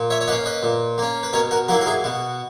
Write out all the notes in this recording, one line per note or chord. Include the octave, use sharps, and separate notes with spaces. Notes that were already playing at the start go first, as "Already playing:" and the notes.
Already playing: A#2
C#5 E5
C#5
A#3 C#4 B4 D#5
B4 D#5
A#2
A#3 C#4
B4
B2 A#4 C#5
F#4 A#4
F#3 A#3 E4 F#4 A#4
A#4
E4 G#4
B2 F#4